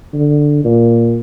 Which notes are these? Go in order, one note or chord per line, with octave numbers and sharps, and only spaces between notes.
D3
A#2